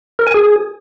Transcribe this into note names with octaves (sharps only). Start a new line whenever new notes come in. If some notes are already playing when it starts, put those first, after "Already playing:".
A#4
G#5
G#4